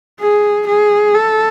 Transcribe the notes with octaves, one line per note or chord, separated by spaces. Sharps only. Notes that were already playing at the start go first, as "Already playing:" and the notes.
G#4
G#4
A4